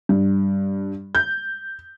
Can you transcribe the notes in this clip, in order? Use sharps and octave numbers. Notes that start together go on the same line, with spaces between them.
G2
G6